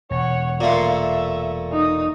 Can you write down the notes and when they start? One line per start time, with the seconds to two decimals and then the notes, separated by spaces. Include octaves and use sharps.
0.11 E1 C#5 F#5
0.61 A#2 A3 A#3 C6
0.91 E5
1.72 D#4 D#6